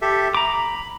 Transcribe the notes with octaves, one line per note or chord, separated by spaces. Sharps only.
G4 A4 E5
A#5 B5 D6